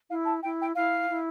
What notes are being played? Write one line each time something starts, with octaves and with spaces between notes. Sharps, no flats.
E4 F5
A5
E4 G5
G5
E4 F5
E4